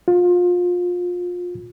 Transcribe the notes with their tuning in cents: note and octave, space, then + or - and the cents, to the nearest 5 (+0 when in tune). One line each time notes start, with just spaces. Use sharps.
F4 +25